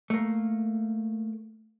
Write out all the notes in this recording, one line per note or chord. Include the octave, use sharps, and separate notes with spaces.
A3 A#3